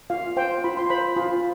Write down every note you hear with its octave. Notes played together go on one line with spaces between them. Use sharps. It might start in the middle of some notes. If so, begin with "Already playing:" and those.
F4 F5
C5 G5
F4 B5
C6
C5 B5
F4 B5